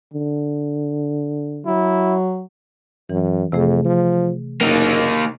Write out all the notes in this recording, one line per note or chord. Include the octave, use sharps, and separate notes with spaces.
D3
F#3 E4
F#2 E3
F2 C3 A3 G#4
F3
F#1 A#3 D#4